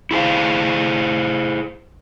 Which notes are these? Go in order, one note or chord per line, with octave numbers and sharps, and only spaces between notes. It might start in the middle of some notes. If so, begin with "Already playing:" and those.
E4 G#4 C5 F5